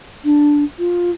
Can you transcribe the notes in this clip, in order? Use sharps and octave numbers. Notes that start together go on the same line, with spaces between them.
D4
F4